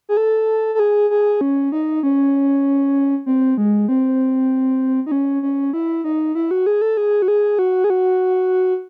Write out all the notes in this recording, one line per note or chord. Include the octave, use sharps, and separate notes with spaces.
G#4
A4
A4
G#4
G#4
C#4
D#4
C#4
C4
G#3
C4
D#4
C#4
C#4
E4
D#4
E4
F#4
G#4
A4
G#4
F#4
G#4
F#4
G#4
F#4